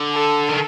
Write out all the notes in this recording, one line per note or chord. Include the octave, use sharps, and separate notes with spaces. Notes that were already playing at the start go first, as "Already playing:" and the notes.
Already playing: D3
A4
D#3